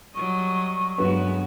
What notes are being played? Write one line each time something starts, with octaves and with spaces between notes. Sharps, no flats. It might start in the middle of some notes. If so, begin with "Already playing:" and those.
F#3 G3 D#5 C#6
G1 F#3 G#3 B3 F#4 B4